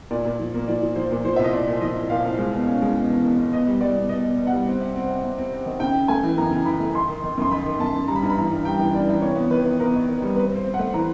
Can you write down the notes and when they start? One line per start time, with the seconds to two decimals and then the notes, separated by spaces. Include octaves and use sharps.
0.11 A#2 D5
0.25 A#2
0.39 F3
0.54 A#3
0.68 F3 D5
0.82 F3
0.95 F3 C5
1.11 A#2
1.24 F3 C5
1.36 C2 E5
1.44 D#5
1.53 C2 D5
1.67 A#2
1.81 F3 D#5
1.96 C2
2.10 A#2 F5
2.24 C2
2.39 G#3
2.53 B2
2.67 C#4
2.82 G#3
2.95 B2
3.10 E2
3.25 B2
3.39 B2
3.53 B2 D#5
3.67 G3
3.81 G3 D5
3.96 B2
4.09 B2 D#5
4.23 B2
4.37 B2
4.47 F#5
4.52 G3
4.67 C4
4.80 C3
4.96 C4
5.09 C3
5.23 C3
5.38 C4
5.52 C4
5.66 D#3
5.80 C#3 G5
5.94 C#3
6.08 A3 G#5
6.23 E3
6.38 F#2 A#5
6.51 C#3
6.65 E3 B5
6.80 A3
6.94 D#3 C6
7.09 D#3
7.24 D#3
7.37 F#2 C6
7.51 D#3 B5
7.66 D#3
7.80 F#2 A5
7.94 F#2
8.08 G3 A#5
8.15 B5
8.23 G2 A#5
8.30 B5
8.38 E3 A#5
8.51 G2
8.65 G3 G5
8.79 E3
8.94 G2 D5
9.09 E3
9.22 C3 C#5
9.36 B3
9.50 D#3 B4
9.65 B3
9.80 B3 A#4
9.93 D#3
10.08 D#3
10.22 G3
10.36 C4 B4
10.51 C4 C5
10.65 C4
10.74 F#5
10.79 A3
10.94 E3 A#5